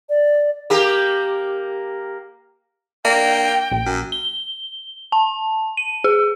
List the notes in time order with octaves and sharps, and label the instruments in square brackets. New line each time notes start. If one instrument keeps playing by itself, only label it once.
[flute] D5
[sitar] A#3 G4
[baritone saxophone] A#3 [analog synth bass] D4 [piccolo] G5
[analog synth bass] A#1
[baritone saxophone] F#2
[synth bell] G7
A5
D#7
G#4